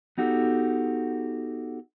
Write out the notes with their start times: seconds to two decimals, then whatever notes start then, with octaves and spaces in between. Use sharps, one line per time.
0.18 B3 D#4 F#4 G4 A4